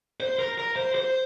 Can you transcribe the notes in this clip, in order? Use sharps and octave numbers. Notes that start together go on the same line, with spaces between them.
C5
A#4
A#4
C5
C5